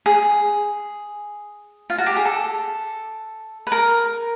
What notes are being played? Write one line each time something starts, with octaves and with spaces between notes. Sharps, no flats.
G#4
F4
F#4
G4
G#4
A4
B4
A#4